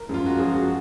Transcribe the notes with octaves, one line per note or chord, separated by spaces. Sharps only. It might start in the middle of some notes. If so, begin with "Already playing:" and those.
Already playing: A#4
F#2 F3 G#3 F4
F#4
F#2 F3 G#3 G#4
F#4